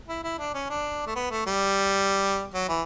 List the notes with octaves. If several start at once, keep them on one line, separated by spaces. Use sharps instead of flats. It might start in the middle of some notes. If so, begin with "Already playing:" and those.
E4
E4
D4
C#4
D4
A3
B3
A3
G3
F#3
E3